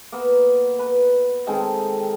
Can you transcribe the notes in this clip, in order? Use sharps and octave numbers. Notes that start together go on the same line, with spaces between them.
A#3 B3
B4
D#3 G#3 C4 A4